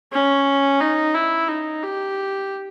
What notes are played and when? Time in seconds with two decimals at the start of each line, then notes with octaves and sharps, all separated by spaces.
0.12 C#4
0.81 D#4
1.15 E4
1.48 D#4
1.83 G4